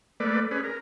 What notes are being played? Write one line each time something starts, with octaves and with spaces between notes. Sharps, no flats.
A3 A#3 B4 D5
C#4 G#4 B4
A#4